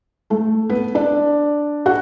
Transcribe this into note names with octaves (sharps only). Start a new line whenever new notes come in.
A3 A4
B3 B4
D4 D5
F#4 F#5